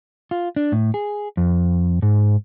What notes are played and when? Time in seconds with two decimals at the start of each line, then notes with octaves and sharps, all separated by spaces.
0.31 F4
0.56 D4
0.72 A2
0.94 G#4
1.37 F2
2.02 G#2